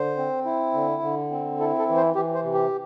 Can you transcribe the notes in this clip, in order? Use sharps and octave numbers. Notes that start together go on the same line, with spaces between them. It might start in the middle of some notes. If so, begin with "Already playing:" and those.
Already playing: D3 C5
C4
E4
D3
D3
C4
E4 A4
A4
E3
C5
E3 G4
C5
C3
G4